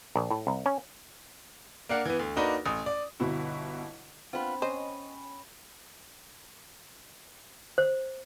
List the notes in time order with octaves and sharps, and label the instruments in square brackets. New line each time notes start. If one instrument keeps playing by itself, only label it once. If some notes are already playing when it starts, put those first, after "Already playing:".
[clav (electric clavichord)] A#1
A2
C2
C#4
[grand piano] A#3 D4 F5 F#5
E3 B3
D2
A#3 D4 D#4 F#4 B4
A1 D#6
D5
[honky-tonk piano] G1 B2 E4 F#4
[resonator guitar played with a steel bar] B3 F4 [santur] C4 D4 B5
[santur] C#4 [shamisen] C5 [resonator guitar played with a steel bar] D#5
[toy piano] C5